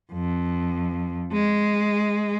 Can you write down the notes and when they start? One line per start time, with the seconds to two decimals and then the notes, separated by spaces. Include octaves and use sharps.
0.13 F2
1.33 G#3